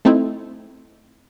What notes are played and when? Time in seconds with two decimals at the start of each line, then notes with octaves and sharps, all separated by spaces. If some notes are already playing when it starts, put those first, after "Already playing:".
0.05 A3 C4 D#4 E4